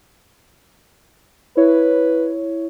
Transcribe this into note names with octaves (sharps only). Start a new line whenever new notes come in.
E4 B4 C#5